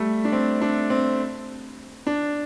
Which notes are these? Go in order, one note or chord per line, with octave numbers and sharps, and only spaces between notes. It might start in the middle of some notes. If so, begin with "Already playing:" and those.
Already playing: G3 A3
D4
C4
D4
C4
D4